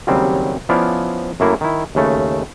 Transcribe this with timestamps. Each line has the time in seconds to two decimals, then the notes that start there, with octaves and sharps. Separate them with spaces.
0.07 D#2 C#3 F#3 G3 C4
0.69 F3 B3 C#4 E4 D5 F5
1.40 F#2 A3 A#3 E4
1.61 D#3 E4
1.95 D#2 C#3 A3